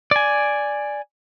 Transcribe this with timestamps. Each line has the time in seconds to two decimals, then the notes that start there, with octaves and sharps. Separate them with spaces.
0.11 D5 G#5